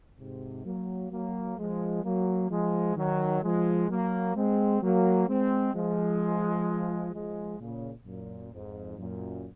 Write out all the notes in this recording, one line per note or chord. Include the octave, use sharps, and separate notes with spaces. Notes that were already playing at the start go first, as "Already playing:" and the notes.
G#2 C3
F#3 A#3
F#3 A#3
F3 G#3
F#3 A#3
F3 G#3
D#3 F#3
F3 G#3
F#3 A#3
G#3 C4
F#3 A#3
G#3 C4
F3 G#3
F3 G#3
A#2 C#3
F#2 A#2
F2 G#2
F#2 A#2